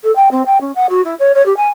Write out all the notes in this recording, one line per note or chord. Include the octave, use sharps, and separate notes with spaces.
A4
G5
C4
G5
C#4
F#5
F#4
E4
C#5
C#5
G4
G#5